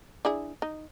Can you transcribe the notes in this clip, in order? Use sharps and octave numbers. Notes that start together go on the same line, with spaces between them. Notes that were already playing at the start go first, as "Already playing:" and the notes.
D4 E4 G#4
D#4